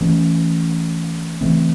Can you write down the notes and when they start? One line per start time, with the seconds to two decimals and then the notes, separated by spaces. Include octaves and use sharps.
0.01 E3 A3 C#4
1.41 C#3 E3 A3 C4